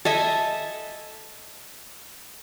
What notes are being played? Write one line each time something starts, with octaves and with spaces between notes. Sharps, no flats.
A4 D#5 E5 G#5